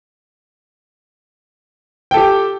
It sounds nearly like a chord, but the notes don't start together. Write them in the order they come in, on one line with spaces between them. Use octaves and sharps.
G5 A4 G4